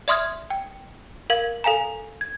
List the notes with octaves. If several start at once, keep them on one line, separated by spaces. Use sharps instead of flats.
D5 E5 C6 D#6 F6 G#6
G5
A#4 F5 G#6
A4 F5 G#5 A#5
G#6